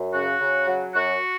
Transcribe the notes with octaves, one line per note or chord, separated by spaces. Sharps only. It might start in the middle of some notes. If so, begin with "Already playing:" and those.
Already playing: F#2
C#3 F#4
C#3
F#3
F#2 F#4